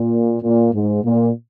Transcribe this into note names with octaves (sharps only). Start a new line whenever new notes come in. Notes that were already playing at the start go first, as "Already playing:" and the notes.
Already playing: A#2
A#2
G#2
A#2